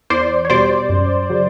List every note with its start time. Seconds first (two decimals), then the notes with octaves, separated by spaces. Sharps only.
0.10 E2 C5 D5
0.45 C#5
0.50 B2 G3 C5 D5
0.89 F#2
1.30 C#3 F#3